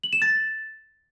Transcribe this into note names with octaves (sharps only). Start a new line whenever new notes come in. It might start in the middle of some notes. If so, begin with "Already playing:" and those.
F#7
E7
A6